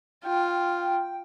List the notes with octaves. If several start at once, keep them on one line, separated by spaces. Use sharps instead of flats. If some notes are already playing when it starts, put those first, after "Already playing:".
F4 G5